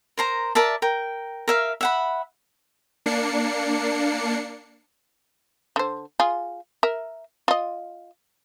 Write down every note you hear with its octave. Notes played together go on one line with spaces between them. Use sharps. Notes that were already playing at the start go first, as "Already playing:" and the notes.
A#4 C5 A#5
A#4 D5 E5 A5
A#4 G5
A#4 E5 F5
E5 F#5 B5
A#3 D4 C7 C#7
D3 C5
F4 G#4
A#4 E5
F4 D#5